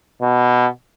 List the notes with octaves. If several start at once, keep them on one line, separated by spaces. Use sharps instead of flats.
B2